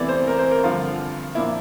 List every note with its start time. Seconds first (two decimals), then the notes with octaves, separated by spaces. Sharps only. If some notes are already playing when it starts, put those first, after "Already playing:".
Already playing: E2 C3 E3 A3 D5
0.09 C5
0.27 A#4
0.39 C5
0.51 A#4
0.63 G2 D3 F3 F4
1.35 A#2 F3 A#3 D4 E4